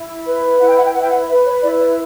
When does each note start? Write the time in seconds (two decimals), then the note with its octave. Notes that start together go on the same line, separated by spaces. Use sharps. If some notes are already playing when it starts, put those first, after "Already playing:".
Already playing: E4
0.25 B4
0.60 E4 F#5
0.68 G5
0.76 F#5
0.85 G5
0.93 B4 F#5
1.01 G5
1.10 F#5
1.28 B4 E5
1.45 C#5
1.62 E4 D5
1.79 D5